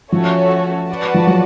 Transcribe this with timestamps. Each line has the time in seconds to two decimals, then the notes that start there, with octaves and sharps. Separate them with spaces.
0.12 F3 A3 C#4 F#4 A4 C#5
0.89 F#4 B4 D5 F#5 A5
1.14 F3
1.27 F#3